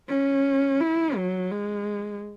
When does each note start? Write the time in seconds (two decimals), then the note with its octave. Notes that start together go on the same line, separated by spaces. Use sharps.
0.09 C#4
0.80 E4
1.16 F#3
1.51 G#3